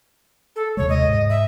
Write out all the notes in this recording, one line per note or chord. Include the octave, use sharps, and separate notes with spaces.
A4
D#2 C3 G#3 C#5
D#5
G#2
E5